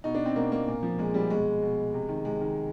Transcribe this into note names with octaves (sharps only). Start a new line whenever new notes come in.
B2 D#4
D4
C4
B2 A#3
A#3
A#2
F3
A#2 G#3
F3 G3
B2 G#3
B2
C3
D#3
C3 G#3
D#3